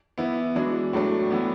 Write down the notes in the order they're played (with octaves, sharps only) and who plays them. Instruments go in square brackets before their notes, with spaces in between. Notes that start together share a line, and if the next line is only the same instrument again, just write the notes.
[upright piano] E3 B3 E4
E3 G#3 D4 F#4
A2 F#3 A3 D4
A2 E3 B3